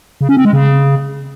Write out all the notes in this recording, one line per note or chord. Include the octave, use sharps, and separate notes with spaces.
C#3
C#4
C4
G#3
C#3